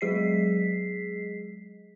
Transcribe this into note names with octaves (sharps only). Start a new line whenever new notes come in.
F#3 G#3 G#4 D#5 B6 C7